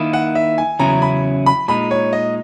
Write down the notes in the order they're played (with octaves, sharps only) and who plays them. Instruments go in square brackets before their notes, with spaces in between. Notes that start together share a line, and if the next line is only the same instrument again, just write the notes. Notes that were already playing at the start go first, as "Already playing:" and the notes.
Already playing: [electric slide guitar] D#3 A#3 E4
[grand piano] F#5
E5
G#5
[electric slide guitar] E2 C#3 F#3 C#4 E4 [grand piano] A#5
[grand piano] B5
B5
[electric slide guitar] A#2 G#3 D#4 [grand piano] B5
[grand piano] C#5
D#5